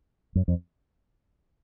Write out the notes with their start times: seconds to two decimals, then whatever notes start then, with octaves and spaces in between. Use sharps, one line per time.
0.35 F#2
0.48 F2